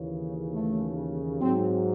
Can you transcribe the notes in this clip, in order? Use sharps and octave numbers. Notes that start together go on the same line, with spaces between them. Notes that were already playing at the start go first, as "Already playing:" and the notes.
Already playing: D#2 C#3 E3
A3
G#2 F#3 C4